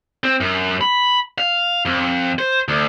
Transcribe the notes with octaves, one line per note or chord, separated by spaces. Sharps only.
C4
F#2
B5
F5
F2
C5
D2